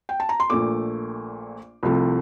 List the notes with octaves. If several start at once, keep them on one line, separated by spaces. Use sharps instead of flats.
G5
A5
A#5
C6
A#1 A#2 A3 D6
C2 C3 F3 A3